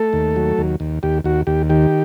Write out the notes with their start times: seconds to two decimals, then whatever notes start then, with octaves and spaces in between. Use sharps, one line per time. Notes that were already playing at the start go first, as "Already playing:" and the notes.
Already playing: A3 A4
0.13 D#2
0.36 F#3
0.58 D#2
0.80 D#2
1.03 D#2 G4
1.24 D#2 F#4
1.47 D#2 G4
1.69 D#3 G4